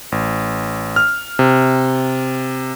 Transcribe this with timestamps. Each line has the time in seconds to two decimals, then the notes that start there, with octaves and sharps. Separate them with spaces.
0.12 A1
0.96 F6
1.39 C3